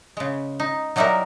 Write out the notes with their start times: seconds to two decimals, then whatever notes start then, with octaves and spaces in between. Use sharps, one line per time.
0.17 C#3 G#3
0.60 D#4
0.96 F#3 G3 D#4 E4 G4 A#4